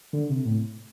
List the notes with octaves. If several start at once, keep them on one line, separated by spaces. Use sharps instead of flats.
D3
C3
A2